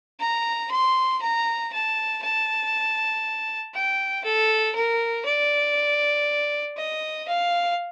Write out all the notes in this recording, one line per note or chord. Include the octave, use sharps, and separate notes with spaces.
A#5
C6
A#5
A5
A5
G5
A4
A#4
D5
D#5
F5